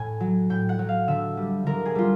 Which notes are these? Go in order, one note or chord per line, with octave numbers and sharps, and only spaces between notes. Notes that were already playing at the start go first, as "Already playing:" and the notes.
Already playing: A2 G#5
F#3
A2 G5
F#5
F#3
F5
D3 E5
G3
D3 A#4
G#4
G3 F4